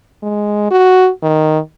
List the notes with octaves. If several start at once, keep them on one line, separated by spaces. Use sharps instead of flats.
G#3
F#4
D#3